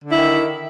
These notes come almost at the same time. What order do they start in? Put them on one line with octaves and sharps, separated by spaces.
D3 E4 D#3